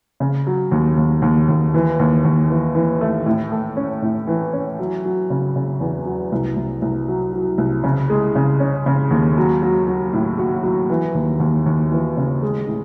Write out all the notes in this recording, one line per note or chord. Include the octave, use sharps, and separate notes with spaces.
C#3
F#3
D#2
D#2
D#2
D#2
E3
D#2
D#2
E3
E3
A3
A2
A3
C#4
A2
E3
C#4
F#3
F#3
C#3
C#3
E2
F#3
C2
C2
C2
F#3
F#3
C2
C#3
G#3
C#3
C#4
C#3
D#2
F#3
F#3
F#3
A2
F#4
F#3
E3
D#2
D#2
D#2
E3
C#3
G#3
A2